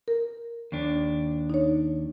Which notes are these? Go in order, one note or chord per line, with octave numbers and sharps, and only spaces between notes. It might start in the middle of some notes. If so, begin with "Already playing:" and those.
A#4
D#2 D4
D#4 C#5